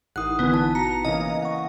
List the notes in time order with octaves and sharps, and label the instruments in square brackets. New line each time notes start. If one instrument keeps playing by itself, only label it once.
[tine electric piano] A1 D#4 E4 [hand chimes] A#4 D#6 F#6 [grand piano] F#5
[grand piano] D3 E3 [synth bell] B3
[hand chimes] A5
[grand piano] B2 [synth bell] A#5 [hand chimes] C#7
[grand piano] C#3 E3 A#3 [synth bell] D#5
[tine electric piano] F#5 C#6